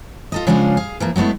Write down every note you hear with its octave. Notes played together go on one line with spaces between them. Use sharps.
F4 A4 D#5
C#3 F3 G#3 C#4 D4 F4
G#4 F5
E3 F3 A#3
F#3 G#3 A3 B3 E4